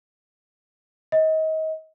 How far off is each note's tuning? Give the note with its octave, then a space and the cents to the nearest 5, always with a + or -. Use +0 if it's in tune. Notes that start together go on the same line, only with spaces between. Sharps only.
D#5 +30